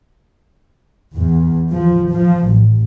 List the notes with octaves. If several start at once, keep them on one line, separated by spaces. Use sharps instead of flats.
E2
F3
F3
A1